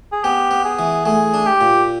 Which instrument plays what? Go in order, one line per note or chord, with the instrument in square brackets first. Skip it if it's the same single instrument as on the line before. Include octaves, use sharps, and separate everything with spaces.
[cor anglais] G#4
[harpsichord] B3 [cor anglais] G4
[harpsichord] B3
[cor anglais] G#4
[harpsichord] E3
[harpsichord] A3 [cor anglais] G#4
[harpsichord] D4
[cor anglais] G4
[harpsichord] A#2